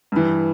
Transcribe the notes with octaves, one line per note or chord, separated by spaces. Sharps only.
G2 E3